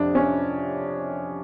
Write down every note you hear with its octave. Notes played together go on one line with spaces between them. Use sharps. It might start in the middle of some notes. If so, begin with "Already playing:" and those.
Already playing: F2 C3 D4
C#4